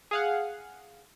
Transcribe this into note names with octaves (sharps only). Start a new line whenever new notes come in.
G#4 F5 F#5